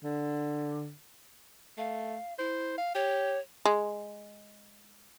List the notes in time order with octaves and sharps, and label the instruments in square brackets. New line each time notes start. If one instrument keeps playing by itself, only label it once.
[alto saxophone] D3
[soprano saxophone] A3 [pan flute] F5
[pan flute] E4 [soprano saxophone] C5
[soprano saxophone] F5
[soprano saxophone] G4 [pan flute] C#5
[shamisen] G#3